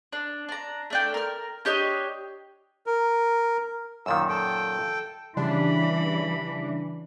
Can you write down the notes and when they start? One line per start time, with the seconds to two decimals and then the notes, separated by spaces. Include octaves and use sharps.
0.13 D4
0.49 D4 A#5
0.90 A3 D4 G5
1.14 A#4 F6
1.65 D4 G4 C#5 D#5
2.87 A#4
4.06 F#2 A#2 D#3 E6
4.29 A4 G5
5.37 C#3 E3 G3 D4 B5